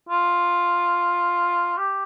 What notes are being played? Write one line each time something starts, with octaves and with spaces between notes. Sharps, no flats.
F4
G4